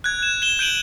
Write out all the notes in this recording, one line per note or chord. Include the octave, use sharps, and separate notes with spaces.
F#6 G#6
E7
E7 G7
G6 D7 D#7 F#7